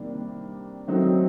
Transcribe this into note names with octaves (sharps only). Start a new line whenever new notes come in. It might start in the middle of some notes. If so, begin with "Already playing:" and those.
Already playing: C3 D#3 G3 A#3 D4
D#3 F#3 A3 C4 D#4